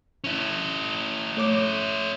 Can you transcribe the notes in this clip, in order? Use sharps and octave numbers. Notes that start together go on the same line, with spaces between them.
C#4 E4
A3 C#5 D6